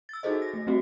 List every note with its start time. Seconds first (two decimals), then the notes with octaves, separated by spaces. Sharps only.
0.09 E6 A6
0.23 D#4 F#4 G#4 A4 C5 D#5
0.42 A#6
0.54 A3
0.67 G3 A3 C4 F#4 G4